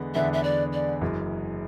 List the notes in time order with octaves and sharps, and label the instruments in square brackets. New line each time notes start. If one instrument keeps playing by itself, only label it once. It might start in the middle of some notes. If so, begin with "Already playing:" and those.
Already playing: [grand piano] E2 D3 G#3 B3 D4
[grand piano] E2 D3 G#3 B3 D4 [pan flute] E5
[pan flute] E5
D5
D5
[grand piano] F#1 F#2 E3 G#3